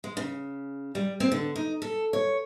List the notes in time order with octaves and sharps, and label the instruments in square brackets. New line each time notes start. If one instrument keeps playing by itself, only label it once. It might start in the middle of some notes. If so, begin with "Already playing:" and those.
[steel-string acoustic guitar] G#3
C#3
G3
C4
D3
D#4
A4
C#5